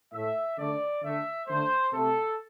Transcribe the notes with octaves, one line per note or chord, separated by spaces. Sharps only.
A2 A3 E5
D3 A3 D5
D3 A3 E5
D3 A3 C5
C3 A3 A4